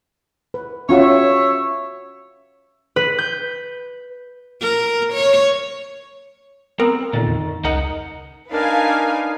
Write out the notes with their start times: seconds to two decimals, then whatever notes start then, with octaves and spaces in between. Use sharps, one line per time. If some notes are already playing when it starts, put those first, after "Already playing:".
0.54 B4
0.89 C#4 F4 F#4 C#5 E5
2.96 B4
3.19 G6
4.61 A#4
5.13 C#5
6.80 B3 C4 A#4
7.13 A#2 D3 D#3
7.27 F2
7.64 C#2 D#4 A#4 D#5 F#5
8.51 D4 D#4 A#4 B4 F5 G#5